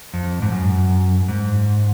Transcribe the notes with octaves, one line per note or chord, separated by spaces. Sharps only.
F2
G#2
F#2
G#2